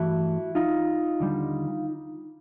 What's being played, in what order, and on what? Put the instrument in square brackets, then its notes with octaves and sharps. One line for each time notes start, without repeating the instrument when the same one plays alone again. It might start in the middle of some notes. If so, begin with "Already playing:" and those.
Already playing: [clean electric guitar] G2 E3 A3 E4 F#4
D#4 F4
D#2 D3 G3